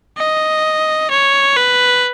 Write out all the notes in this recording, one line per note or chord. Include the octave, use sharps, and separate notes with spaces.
D#5
C#5
B4